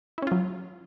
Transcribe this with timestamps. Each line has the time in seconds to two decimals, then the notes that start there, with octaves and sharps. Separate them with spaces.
0.18 E4
0.22 C#4
0.27 F4
0.32 F#3